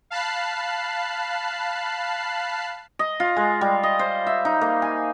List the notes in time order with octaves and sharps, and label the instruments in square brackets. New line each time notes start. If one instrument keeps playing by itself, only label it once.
[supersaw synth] F5 A5 B5 F#6 C7
[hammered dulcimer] D#5
F4
G#3
G3
D#5
C5
E5
D#4
A#3
G#5